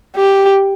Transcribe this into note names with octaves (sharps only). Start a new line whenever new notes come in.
G4